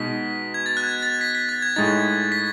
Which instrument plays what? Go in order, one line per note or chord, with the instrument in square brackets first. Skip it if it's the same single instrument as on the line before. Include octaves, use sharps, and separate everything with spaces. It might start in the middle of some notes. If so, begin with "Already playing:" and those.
Already playing: [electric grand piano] B2 G#3 D#4 [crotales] B6
[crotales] G#6
A6
F#6
G#6
A6
B6
B6
A6
G#6
[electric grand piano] A2 G#3 D#4 [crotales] A6
[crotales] B6